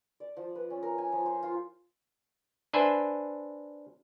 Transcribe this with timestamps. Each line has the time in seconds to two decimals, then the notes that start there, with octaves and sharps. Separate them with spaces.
0.20 D5
0.37 F3
0.55 B4
0.70 C#4
0.83 A#4
0.98 G#5
1.12 F3
1.26 C5
1.43 F4
2.73 D4 B4 C5 E5 G#5